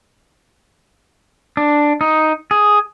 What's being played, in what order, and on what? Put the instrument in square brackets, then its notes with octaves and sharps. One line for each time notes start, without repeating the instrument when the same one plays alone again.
[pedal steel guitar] D4
D#4
G#4